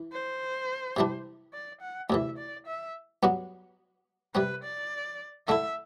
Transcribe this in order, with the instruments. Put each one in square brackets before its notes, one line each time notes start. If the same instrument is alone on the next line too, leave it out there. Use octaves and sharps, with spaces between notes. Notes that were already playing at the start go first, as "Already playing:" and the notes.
Already playing: [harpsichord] E3
[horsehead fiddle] C5
[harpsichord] C3 E3 G3 D4
[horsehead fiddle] D5
F#5
[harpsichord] D2 C3 E3 [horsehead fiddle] E5
[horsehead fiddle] D5
E5
[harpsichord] G2 F#3 B3 F#4
[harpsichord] C3 G3 C4 [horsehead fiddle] B4
[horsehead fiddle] D5
[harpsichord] D3 A3 E4 [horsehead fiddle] E5